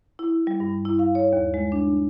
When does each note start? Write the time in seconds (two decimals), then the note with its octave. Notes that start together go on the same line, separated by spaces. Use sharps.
0.19 E4
0.47 G3
0.60 G2
0.85 E4
0.99 F5
1.15 C#5
1.33 D#2
1.54 G#3
1.72 D4